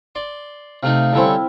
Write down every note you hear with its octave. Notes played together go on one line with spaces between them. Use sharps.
D5 C6
C3 A3 D#4 F5
D3 G3 C4 C#4 E4 A5